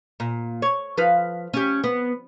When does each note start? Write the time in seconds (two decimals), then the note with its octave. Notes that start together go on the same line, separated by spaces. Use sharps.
0.20 A#2
0.62 C#5
0.97 F3 B4 F5
1.53 C#4 G4
1.84 B3